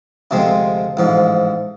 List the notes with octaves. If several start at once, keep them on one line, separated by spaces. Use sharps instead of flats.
D2 C3 F3 G#3 C4
A1 G#2 F3